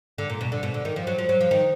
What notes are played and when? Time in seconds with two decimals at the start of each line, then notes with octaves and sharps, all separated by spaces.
0.18 D3
0.30 A#2
0.41 B2
0.52 D3
0.63 B2
0.74 D3
0.85 D#3
0.96 F3
1.07 F#3
1.18 F3
1.29 F#3
1.41 F3
1.51 D#3